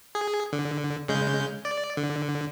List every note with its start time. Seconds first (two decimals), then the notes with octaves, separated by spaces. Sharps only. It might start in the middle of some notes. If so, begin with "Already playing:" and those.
0.15 G#4
0.53 D3
1.08 C#3 G#3 G6
1.65 D5
1.97 D3